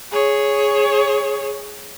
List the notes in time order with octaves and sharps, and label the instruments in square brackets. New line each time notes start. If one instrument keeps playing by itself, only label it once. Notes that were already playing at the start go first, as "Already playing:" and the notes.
[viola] G#4 C#5